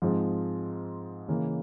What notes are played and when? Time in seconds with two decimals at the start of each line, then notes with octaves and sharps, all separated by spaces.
0.02 G#2 F3 G#3 C4 F4
1.28 C#3 E3 A#3